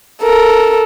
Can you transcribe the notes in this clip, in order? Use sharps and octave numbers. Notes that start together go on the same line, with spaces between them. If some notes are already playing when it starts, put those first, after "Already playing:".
A4 A#4